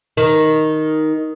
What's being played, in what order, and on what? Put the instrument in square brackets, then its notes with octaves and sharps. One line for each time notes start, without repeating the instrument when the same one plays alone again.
[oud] D#3